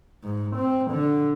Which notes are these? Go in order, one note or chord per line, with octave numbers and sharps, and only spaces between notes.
G#2
C4
D3